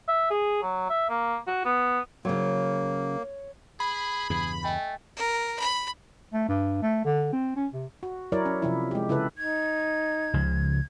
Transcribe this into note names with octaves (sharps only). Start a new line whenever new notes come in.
E5
G#4
F#3
E5
A#3
F#4
B3
C#3 F#3 A#3 C#5
G#4 B5
E2 G2 C#3 G#4
A3 D#5 G5 G#5
A#4
B5
A3
G2
A3
D3
C4
C#4
C3
F#4
F#3 E4 A#4 C#5 D5
C#4
C3 F3 E4
G#3 G4
C#3 E4 A4 B4
D#4 G#6
C#2 C#3 F3